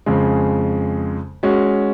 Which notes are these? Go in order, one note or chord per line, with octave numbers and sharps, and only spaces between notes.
F2 C#3 G#3
G#3 C#4 F#4